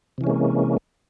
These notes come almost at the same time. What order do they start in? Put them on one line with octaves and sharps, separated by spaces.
C3 E3 C#4 G#3 A#3